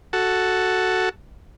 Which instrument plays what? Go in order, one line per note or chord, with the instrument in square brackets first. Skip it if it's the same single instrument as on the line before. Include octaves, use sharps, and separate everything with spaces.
[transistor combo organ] F#4 A4